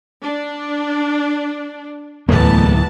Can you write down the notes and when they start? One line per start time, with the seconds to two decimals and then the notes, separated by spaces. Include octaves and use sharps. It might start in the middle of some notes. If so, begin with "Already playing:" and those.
0.22 D4
2.29 D1 G#1 E2 A2 E3 A#3 B3 A5